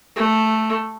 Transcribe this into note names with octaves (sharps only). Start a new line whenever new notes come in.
A3